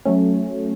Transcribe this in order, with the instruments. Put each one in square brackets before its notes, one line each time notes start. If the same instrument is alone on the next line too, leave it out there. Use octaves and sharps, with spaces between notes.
[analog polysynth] F#3 A3 C#4